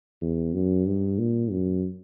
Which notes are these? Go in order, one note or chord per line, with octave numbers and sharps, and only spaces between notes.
E2
F#2
G2
A#2
F#2